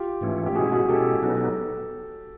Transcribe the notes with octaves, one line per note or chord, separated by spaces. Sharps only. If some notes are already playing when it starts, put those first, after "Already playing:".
Already playing: F4 G4
G#2 E3 A3 C#4
G4
B2 G#3 C#4 E4 F#4 G#4
F#4 G#4
B2 G#3 C#4 E4 G4 A4
B2 F#3 B3 D#4 G4 A4